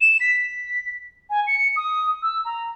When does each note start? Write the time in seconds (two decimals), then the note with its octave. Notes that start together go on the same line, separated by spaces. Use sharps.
0.01 E7
0.21 B6
1.30 G#5
1.47 C#7
1.76 D#6
2.23 E6
2.45 A#5